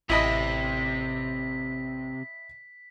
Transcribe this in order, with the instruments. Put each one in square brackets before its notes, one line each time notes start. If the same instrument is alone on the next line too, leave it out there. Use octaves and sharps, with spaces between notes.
[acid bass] A1 [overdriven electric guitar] C3 [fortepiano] E4 D#5 B5 [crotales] B6